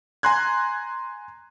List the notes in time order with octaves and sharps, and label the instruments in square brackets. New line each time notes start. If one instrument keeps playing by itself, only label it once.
[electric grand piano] G#5 A#5 C6 F#6 G#6